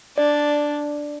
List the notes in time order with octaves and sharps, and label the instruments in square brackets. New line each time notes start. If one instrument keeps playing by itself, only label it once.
[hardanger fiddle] D4 [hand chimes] D5